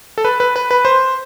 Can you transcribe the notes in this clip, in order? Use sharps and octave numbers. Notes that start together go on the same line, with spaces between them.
A4
B4
B4
B4
B4
C5